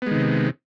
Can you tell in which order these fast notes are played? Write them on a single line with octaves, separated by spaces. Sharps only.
B3 G#3 D#3 C3